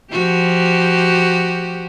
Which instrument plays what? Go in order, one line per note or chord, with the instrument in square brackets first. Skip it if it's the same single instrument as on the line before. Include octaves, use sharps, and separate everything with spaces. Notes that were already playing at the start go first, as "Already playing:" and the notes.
[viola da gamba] F3 F#4 G4